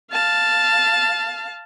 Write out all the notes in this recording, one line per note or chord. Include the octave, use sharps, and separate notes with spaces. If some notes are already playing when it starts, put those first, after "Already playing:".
F5 A5